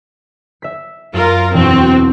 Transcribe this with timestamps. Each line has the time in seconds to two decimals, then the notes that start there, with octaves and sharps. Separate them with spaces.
0.62 E5 B6
1.14 F#2 F4 A#4
1.54 E1 C4 F#4